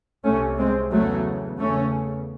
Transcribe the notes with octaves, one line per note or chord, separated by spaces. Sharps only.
C2 C3 A3 C#4
G#3 C4
E2 C#3 F#3 A3
E2 C#3 A3 C#4